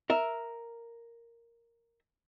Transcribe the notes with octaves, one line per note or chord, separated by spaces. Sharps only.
A#4 E5